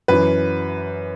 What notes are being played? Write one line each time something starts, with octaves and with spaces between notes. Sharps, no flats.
F#2 E3 B4